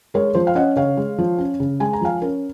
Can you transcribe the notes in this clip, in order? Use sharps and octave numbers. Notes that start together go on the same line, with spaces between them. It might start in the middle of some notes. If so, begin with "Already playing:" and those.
G#3 A#4 C#5
F3 C5
F5
C#4 D#5 F#5
C#3 C#5 F5
G#3
F3
C#4
C#3
G#3 G#5
A#5
F3 F5 G#5
C#4 A#4